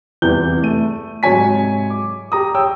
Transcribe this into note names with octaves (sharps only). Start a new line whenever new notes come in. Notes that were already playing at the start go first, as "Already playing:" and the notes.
E2 G2 C3 E3 G6 G7
A3 D#7
G#2 C3 F#3 C#5 G#5 B6
D6
G4 A#5 D#6
C#5 G5 E6